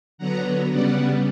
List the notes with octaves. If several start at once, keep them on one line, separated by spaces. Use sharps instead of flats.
D3 F#3 B3 F#5 A#5
C#3 G3 B3 D5 F#5